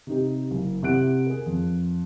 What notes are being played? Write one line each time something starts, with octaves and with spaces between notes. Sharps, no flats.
C3 D#4 G4
F#1
C3 E4 F#5 F#6 D7
G#4 A#4
F2